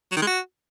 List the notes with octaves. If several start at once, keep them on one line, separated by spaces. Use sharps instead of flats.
F#3
D#3
G#3
F#4